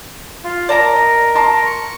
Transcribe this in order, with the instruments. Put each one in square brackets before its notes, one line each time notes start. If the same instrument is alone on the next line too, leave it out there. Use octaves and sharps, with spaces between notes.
[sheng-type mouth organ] F4
[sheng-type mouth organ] A#4 [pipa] D5 A5 A#5
[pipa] D#5
[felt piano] A5 A#5 C6
[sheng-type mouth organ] C#6